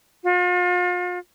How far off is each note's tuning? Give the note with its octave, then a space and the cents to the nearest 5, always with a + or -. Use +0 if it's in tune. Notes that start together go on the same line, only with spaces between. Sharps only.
F4 +40